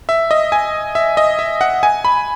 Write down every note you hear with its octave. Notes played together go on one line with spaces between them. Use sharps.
E5
D#5
G#5
E5
D#5
E5
F#5
G#5
B5